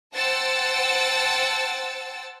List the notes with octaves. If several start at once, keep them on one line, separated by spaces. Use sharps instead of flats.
C5 F#5 G5 A5 E6 A6